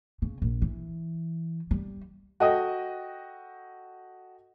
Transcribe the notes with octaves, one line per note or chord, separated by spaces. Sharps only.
C#3
A#1
E3
G3
F#4 A4 D#5 G5 D#6